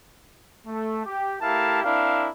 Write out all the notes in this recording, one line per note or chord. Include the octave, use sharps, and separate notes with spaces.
A3
G4
A3 E4 G4 A#4 F5 A5
C4 D4 E4 A#4 F5